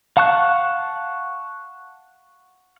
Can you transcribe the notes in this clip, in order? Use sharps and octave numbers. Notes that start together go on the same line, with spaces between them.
F5 F#5 A5 C#6 F#6